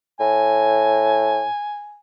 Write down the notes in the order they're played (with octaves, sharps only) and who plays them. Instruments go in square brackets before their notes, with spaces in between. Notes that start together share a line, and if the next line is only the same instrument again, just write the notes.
[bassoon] A2 [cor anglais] G#5